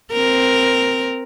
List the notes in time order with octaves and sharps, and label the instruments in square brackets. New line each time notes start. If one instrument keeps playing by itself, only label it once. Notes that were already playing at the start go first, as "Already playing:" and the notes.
[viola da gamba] C4 A#4